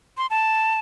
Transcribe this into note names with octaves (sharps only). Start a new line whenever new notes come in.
C6
A5